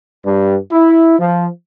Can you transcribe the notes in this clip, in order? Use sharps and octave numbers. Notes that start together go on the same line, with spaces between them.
G2
E4
F3